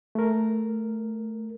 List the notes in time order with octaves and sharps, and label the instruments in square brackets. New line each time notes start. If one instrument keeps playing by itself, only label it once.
[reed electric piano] A3 A#4